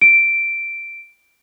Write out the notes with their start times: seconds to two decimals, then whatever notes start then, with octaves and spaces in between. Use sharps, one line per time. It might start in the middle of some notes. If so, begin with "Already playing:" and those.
0.01 D7